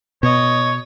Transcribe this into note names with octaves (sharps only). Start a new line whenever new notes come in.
B2 C#5 D#5